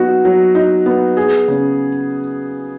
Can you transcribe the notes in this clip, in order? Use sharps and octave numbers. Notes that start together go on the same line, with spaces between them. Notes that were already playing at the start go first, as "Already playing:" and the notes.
Already playing: F#3 B3 D#4 F#4
F#3
D#4
B3
G#4
C#3